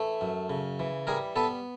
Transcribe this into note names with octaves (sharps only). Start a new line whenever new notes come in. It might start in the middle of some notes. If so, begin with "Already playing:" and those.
Already playing: E3 A3
F#2
C#3
E3
G3 G#4 A#4
B3 A4 B4